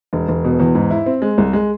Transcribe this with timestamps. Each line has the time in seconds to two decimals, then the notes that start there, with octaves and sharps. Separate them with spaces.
0.13 E1
0.28 E1
0.44 B2
0.60 E2
0.75 G#2
0.91 E4
1.06 C4
1.22 G#3
1.38 C2
1.53 G#3